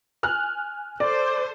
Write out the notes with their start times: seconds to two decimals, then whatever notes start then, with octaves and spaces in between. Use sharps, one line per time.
0.23 G#5 F6 F#6
1.00 A4 C5 D5